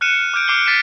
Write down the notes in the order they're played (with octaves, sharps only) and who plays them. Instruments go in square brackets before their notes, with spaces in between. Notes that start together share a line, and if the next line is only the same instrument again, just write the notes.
[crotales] F6 F#6 C#7 D#7 E7
D6 F6 G6 D7
D6 C7 G7
F#6 A6 B6 C7 D#7 E7